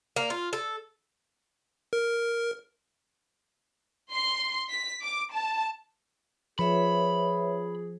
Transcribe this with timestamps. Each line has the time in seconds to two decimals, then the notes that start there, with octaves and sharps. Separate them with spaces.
0.16 A#3
0.30 F4
0.53 A4
1.93 A#4
4.11 C6
4.70 B6
5.02 D6
5.31 A5
6.59 F3 G#4 B4 C#5 E5 B5